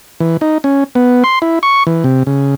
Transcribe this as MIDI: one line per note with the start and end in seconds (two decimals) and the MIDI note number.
0.20 0.37 52
0.41 0.58 63
0.64 0.84 61
0.95 1.23 59
1.24 1.39 84
1.42 1.59 64
1.63 1.83 85
1.87 2.04 52
2.04 2.23 48
2.27 2.55 49